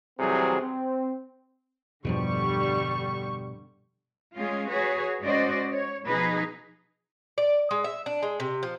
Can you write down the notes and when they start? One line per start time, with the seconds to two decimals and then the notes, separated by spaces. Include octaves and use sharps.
0.19 C3 E3 F#3 G3 C4 G#4
0.61 C4
2.05 E2 G2 B2 D3 F3 G3 C#6
4.36 G#3 C#4 F4 G#4
4.69 F#4 G#4 B4 C#5
5.21 G#2 C#4 F#4 C5 D5 D#5
5.70 C#5
6.05 B2 F3 D#4 G#4 B4
7.38 D5
7.71 G#3
7.84 E5
8.06 D4
8.23 G#3
8.40 C3
8.63 F3